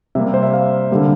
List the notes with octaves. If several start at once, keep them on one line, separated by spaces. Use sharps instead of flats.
C3 G3 A#3 E5
C5
E5
F5
D3 G3 A#3